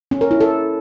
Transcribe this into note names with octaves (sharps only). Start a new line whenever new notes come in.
C#4
A#4
E4
A4